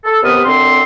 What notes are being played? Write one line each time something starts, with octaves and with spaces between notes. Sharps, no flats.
A4
D#2 C3 B3 B4 D#6 F6
F#2 D3 C4 C6